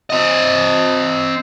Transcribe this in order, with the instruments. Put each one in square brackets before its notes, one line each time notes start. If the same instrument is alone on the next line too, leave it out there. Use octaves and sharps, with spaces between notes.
[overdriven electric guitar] C4 D#5